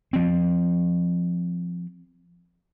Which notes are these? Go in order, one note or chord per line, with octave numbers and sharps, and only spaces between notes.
F3 C4